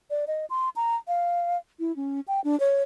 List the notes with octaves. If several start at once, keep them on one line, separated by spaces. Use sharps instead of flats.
D5
D#5
C6
A#5
F5
E4
C#4
G5
D4
C#5